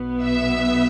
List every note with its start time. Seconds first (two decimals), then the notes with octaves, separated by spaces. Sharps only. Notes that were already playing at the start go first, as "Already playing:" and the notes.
Already playing: B1 B2 B3
0.22 E5